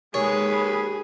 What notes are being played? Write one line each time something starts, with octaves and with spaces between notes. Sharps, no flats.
D#2 G#3 G#4 B4 C#5